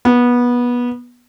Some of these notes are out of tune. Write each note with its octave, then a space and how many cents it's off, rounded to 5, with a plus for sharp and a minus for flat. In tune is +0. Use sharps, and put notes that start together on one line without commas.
B3 -20